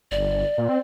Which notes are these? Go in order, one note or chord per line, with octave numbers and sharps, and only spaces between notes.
G1 D5
A#2
C4